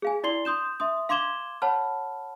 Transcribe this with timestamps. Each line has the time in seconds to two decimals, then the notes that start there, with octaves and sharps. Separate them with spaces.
0.02 G#4 F5 G#5
0.24 E4 D5 C6 C7 G7
0.45 C6 D#6 G6 E7
0.80 E5 C6 D#6
1.09 F5 C6 D6 G#6 E7 G7
1.62 C#5 F#5 A5 B5 F6